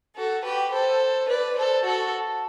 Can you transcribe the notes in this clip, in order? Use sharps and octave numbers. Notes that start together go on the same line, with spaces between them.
F#4 A4
G4 B4
A4 C5
B4 D5
A4 C5
F#4 A4